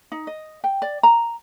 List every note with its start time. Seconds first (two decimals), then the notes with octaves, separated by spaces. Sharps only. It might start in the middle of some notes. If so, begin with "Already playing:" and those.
0.12 D#4
0.27 D#5
0.64 G5
0.82 D5
1.03 A#5